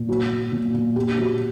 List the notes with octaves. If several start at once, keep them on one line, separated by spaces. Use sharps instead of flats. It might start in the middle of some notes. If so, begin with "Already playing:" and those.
Already playing: A#2
F#3
F#3
A#2
A#2
A#2 G4
F#3 F#4